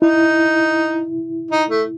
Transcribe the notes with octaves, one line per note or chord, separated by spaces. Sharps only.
D#4 E4
D#4
A3